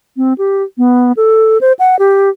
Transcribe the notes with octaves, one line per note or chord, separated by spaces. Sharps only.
C4
G4
B3
A4
C5
F#5
G4